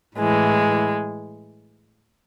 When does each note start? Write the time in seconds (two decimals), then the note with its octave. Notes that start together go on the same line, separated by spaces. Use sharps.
0.17 A2 E3 G#3